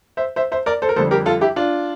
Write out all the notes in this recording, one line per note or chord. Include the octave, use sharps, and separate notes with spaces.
C5 E5
C5 E5
C5 E5
A#4 D5
A4 C5
A#4
F2 D3 G3 A4 C5
G4 A#4
F4 A4
E4 G4
D4 F4